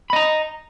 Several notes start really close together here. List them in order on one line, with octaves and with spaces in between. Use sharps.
B5 D#5 A#5